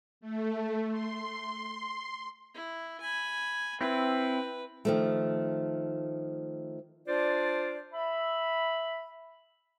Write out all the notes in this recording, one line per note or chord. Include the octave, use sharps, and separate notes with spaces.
A3
C6
E4
G#5 B5
C4 E4 B4
D#3 F3 A3
D4 F4 C5 D5
E5 B5